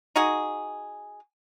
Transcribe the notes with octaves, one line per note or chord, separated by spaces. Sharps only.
D#4 F#4 G#4